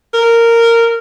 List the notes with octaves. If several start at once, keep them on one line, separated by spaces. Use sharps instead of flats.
A#4